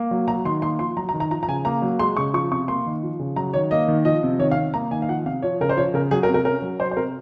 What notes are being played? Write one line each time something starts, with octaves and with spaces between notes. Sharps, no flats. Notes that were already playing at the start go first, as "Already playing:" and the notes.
Already playing: A#3
F#3
F#3 A#5
D#3 C6
A#3 C6
F3 C6
F#3 A#5
A#5
D#3
A#5
F3 A#5
A#5
C#3 G#5
A#3 A#5
F#3
G#3 C6
C#3 C#6
F3 C#6
C3 C#6
A#3 C6
D#3
F3
C#3
F#3 A#5
D#3 C#5
A#3 D#5
D#3
F3 D#5
C3
D#3 C#5
F5
C3
A#3 A#5
D#3 G#5
F5
F3 F#5
C3 F5
F3 C#5
C#3 A#4
C5
F3 C#5
C#3 A#4
F#3 G#4
A#4
C3
A#4
C#4 A#4
F#3
F#3 C5
C5
C3 A#4